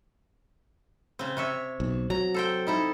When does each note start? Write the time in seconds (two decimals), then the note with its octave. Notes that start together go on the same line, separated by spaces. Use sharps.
1.19 C#3 C4
1.37 C3 C#5 E5
1.80 B1
2.10 F#3 A#5
2.34 A4 C5 G5
2.67 D#4 E4 A4